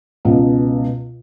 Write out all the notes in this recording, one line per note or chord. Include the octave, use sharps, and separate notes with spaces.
C#2 B2